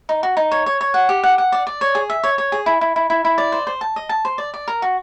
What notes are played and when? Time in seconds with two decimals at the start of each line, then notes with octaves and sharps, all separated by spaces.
0.09 D#4
0.23 F#4
0.37 D#4
0.51 C#5
0.66 C#5
0.81 C#5
0.94 F#5
1.09 G4
1.23 F#5
1.38 F#5
1.52 D5
1.67 D5
1.81 C#5
1.95 G#4
2.10 E5
2.23 C#5
2.38 C#5
2.52 G#4
2.66 E4
2.81 E4
2.96 E4
3.10 E4
3.25 E4
3.38 D5
3.52 C5
3.67 C5
3.81 A5
3.96 D#5
4.09 A5
4.25 C5
4.38 D5
4.54 D5
4.68 A#4
4.82 F#4